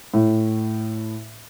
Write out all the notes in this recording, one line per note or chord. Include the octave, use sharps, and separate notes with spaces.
A2